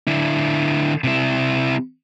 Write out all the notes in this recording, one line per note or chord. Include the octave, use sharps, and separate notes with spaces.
D3 E4
C3 E4